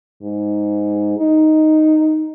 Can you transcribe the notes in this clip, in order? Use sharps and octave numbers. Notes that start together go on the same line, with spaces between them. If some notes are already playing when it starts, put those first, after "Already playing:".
G#2
D#4